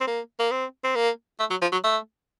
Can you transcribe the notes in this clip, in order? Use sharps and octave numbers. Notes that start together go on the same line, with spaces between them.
C4
A#3
A#3
C4
C4
A#3
A3
F#3
F3
F#3
A3